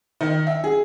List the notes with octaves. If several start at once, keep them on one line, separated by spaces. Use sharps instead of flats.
D#3
E5
G#4